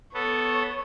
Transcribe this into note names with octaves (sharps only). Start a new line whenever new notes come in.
B3 A4 C#5